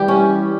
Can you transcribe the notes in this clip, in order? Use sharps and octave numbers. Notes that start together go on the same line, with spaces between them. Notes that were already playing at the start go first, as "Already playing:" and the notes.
Already playing: E3 G3 G4
C#4